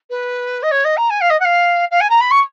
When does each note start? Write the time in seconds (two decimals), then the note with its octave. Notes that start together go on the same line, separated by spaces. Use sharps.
0.10 B4
0.63 D#5
0.71 C#5
0.84 D#5
0.97 A#5
1.10 G#5
1.21 F5
1.30 D#5
1.40 F#5
1.45 F5
1.91 F5
2.00 G#5
2.10 A#5
2.21 B5
2.31 C#6